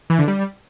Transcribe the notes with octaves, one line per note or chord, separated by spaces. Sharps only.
E3
D3
G3